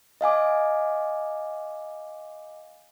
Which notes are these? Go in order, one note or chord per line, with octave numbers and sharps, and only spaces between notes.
D#5 F5 G#5 D6